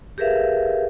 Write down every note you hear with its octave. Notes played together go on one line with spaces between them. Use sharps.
G4 G#4 A#4 B4 E5 F5